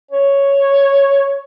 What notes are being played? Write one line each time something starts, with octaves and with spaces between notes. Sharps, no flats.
C#5